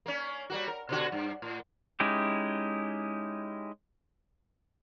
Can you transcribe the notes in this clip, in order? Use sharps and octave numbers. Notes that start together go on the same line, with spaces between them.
A#3 C#4
G3 A#3 F#4
A#4
B2 D3 F#4
G2
A2
G#3 C#4 D#4 E4 G4